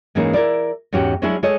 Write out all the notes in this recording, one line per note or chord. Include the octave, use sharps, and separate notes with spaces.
G#2 E3 G#3 A#3 C#4 D#4
E4 A#4 D5
E2 G#2 C#4 F#4 G4 F#5
F#3 G#3 C#4 D4 E4 G#4
G#3 A4 C#5 D#5